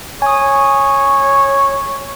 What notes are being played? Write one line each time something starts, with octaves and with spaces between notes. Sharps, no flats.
C#5 G#5 D#6